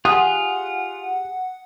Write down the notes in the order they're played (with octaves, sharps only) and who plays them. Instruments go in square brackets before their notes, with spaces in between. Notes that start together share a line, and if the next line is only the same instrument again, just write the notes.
[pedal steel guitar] F4 [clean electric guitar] G4 G#4 [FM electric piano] F#5 [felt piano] D#6